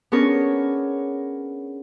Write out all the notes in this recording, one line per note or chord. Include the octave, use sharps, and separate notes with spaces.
B3 C#4 D4 G#4 A#4 C#5